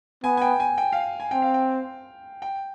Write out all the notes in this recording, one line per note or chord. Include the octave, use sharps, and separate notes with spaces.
B3 G#5
G#5
G5
G#5
G5
F5
G#5
C4 G5
F5
G5
G5